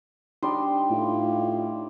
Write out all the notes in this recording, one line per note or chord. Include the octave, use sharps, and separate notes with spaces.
G3 D4 D#4 C6
A2 F4